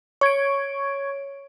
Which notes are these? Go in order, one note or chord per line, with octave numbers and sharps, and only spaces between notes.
C#5 C#6 G#6 D7